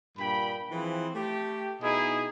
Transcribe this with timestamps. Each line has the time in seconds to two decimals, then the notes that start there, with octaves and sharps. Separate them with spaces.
0.17 G2 A#2 G5 B5
0.70 E3 F3 C4 G#4 B4
1.14 A3 G4
1.81 B2 D#4 E4 G#4 D#5